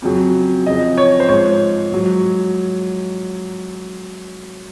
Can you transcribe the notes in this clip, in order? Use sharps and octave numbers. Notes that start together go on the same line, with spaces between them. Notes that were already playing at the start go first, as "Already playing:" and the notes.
F2 C#3 F#3
F2 C#3 F3 D#5
C#5
C5
G#2 F3 C#5
G#2 F#3